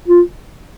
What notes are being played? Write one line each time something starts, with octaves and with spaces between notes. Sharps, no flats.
F4